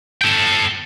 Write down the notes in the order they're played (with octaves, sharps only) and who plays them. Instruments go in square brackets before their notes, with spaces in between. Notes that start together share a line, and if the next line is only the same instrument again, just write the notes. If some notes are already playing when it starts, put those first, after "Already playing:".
[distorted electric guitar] A4 G5